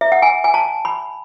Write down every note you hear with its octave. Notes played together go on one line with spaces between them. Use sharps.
E5
F#5
G#5
G#5
A5
B5